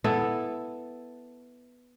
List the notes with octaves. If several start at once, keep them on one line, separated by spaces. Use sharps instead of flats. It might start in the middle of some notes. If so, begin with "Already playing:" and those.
B3 E4 A4